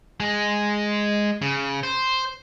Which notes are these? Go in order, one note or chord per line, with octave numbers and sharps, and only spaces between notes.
G#3
C#3
C5